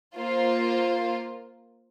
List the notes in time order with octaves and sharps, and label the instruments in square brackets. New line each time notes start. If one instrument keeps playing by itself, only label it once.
[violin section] A#3 F4 C5